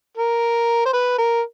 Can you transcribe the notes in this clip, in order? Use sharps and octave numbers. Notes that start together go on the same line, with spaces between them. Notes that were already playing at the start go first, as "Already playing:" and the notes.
A#4
C5
B4
A#4